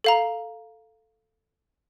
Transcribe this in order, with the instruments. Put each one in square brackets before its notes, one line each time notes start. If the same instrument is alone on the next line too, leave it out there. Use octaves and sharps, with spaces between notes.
[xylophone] A4 F5 A#5